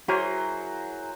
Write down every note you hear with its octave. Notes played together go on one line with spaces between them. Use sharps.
F#3 E4 F#4 G#4 A#4 C5